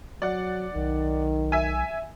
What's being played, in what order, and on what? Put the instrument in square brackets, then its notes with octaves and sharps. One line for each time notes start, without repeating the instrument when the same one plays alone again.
[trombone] F#3 [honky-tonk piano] D5 F#5
[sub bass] B1 [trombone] D#3
[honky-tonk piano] E5 G#5